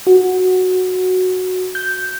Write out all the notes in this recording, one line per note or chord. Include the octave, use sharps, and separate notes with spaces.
F#4
G6